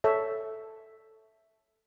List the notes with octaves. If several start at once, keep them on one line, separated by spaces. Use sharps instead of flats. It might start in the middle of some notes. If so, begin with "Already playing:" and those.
A4 C#5 E5